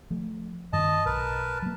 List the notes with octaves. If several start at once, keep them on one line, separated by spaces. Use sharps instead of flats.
F3 A3
G2 D#3 C#4 D#5 A5
B1 A#4 B4 A5
F#3 A#3